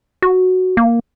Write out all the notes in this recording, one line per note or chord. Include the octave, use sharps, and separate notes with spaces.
F#4
A#3